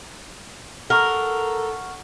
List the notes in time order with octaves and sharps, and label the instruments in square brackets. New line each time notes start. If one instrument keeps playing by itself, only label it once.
[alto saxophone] A4 [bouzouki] A#4 [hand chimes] F#5 C#6 F6